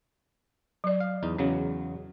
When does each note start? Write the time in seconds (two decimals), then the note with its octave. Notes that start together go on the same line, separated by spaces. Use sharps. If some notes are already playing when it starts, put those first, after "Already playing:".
0.84 F#3 D5
1.00 F5
1.23 E2 D#4
1.38 E2 C#3 F#3 C#4